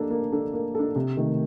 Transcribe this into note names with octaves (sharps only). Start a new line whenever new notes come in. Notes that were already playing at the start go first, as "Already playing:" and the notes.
Already playing: A#3 D4 A4
A#3
D4 A4
A#3
D4 A4
C3
D#3 A3